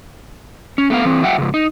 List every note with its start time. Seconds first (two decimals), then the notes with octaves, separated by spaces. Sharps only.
0.78 C#4
0.90 A3 B3 F5
1.05 E3 C4
1.23 F#3 E5 F#5 G5
1.38 G#2 C#3
1.54 D#4